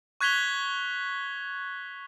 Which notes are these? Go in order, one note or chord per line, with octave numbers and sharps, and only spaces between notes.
C#6 F#6 G#6 B6 F7 G7